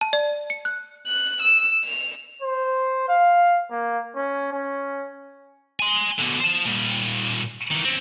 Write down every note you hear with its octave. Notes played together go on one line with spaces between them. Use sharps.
A5
D5
C#7
F#6
F#6
E6
F7
C5
F5
A#3
C#4
C#4
G#5 C6
B2 D3
C5 A5
A#2 G3
D#3 E3
C4 C#4